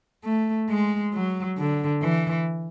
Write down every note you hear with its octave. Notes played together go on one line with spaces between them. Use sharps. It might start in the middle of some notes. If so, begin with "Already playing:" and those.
A3
G#3
F#3
D3
E3